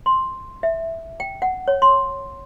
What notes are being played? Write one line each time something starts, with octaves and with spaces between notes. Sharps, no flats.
C6
E5
G5
F#5
C#5
C6